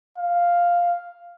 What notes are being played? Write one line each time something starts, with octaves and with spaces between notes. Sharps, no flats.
F5